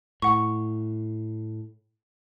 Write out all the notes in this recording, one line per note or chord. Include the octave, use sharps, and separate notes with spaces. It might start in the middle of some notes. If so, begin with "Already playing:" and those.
A2 F#5 C#6